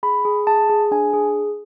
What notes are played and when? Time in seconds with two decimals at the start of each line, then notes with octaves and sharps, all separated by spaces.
0.03 G#4 B5
0.25 G#4
0.47 G#4 A5
0.69 G#4
0.91 D4 G#5
1.14 G#4